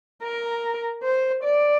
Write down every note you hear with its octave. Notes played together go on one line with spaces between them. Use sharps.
A#4
C5
D5